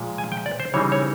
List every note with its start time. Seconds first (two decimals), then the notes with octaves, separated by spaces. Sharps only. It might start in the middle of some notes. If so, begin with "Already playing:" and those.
Already playing: A#2 F3 G#3
0.18 G#5
0.32 G5
0.46 D5
0.60 C5
0.74 C#3 E3 G3 C4 D#4 C#5
0.92 C#5